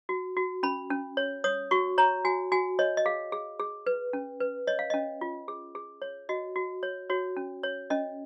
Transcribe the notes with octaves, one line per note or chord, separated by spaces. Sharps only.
F#4
F#4
C#4 B5
C#4
C#5
C#5 D#6
F#4 C#6
C#5 A#5
F#4 G#5
F#4 G#5
C#5 D#5
D#5
G#4 F5
G#4
G#4
B4
C#4
B4
C#5 D#5
F5
C#4 D#5
F4
G#4
G#4
C#5
F#4 D#5
F#4
C#5
F#4 C#5
C#4
C#5
C#4 D#5